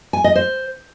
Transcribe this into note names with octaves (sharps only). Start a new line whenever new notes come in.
G#5
D#5
C5